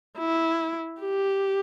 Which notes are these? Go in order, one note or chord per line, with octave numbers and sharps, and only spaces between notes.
E4
G4